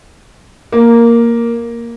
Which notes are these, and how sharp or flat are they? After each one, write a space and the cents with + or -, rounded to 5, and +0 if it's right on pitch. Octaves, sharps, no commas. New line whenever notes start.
A#3 +0